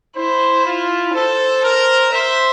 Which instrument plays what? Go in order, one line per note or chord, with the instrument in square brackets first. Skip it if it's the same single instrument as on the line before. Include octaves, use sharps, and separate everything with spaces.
[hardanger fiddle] E4 [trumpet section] C5
[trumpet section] F4
[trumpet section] A4 [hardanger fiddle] C5
[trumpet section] A#4
[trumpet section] C5 [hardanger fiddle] E5